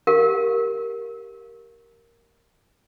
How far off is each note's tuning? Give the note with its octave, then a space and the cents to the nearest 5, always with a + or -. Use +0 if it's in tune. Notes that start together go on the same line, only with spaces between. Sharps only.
G4 +0 A#4 +0 F5 +0